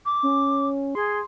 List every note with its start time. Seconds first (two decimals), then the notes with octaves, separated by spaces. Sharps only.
0.06 D6
0.23 C#4
0.95 G#4 C6